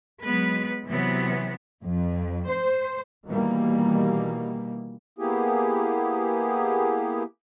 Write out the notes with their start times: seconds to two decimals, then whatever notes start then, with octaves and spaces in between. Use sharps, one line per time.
0.24 F#3 G#3 B3 B4
0.88 C3 E3 F#3 B3
1.84 F2
2.49 C5
3.27 B2 D#3 E3 G3 A#3
5.19 A#3 B3 E4 G4 G#4